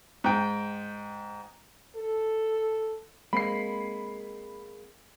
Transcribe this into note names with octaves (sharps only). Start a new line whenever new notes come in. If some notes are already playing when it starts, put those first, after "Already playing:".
G#2 G5
A4
G#3 A#3 C4 B5 C7